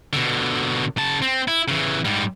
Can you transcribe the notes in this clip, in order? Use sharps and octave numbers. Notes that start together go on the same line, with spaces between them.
B2 D3
C#3 A5
C4
E4
C#3 E3
G#2 G3